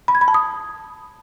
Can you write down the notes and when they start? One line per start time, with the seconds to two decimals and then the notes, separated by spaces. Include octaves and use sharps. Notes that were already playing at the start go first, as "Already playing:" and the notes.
0.08 B5
0.15 G#6
0.21 B5
0.28 A5
0.34 D#6